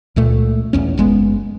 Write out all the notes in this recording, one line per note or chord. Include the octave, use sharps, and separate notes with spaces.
C#2 A#2 A3
B1 E2 C#4
F#1 G#3 B3